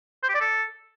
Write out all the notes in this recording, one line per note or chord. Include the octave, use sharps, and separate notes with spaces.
C5
G4
D5
A4